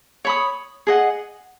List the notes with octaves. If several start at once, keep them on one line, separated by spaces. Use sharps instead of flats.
C#5 B5 D#6
G#4 D#5 F#5